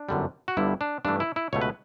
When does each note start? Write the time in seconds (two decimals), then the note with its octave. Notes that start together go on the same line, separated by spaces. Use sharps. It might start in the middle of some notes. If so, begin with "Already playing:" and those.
Already playing: D4
0.09 G1 F#2 D3 G3
0.48 F#4
0.57 G1 G2 D3 G3 E4
0.81 D4
1.05 G2 E3 A3 D4
1.20 E4
1.36 E4
1.53 C#2 B2 A3 C#5
1.61 B4